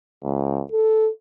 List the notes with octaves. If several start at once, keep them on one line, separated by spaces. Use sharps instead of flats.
C#2
A4